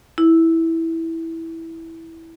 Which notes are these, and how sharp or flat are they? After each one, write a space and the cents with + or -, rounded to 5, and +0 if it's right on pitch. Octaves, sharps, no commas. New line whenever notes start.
E4 -10